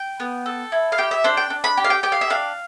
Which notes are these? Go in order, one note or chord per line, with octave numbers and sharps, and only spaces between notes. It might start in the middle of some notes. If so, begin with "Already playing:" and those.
Already playing: G5
B3
A4
E4
F5
G4 G5
E5
D4 C5
G5
D4
B5
G4
F5
G5
G4 G5
F5
E5
D4 F5